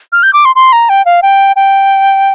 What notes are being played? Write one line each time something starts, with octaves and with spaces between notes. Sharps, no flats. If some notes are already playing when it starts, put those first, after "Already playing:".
F6
G6
D6
C6
C6
A#5
G5
F5
G5
G5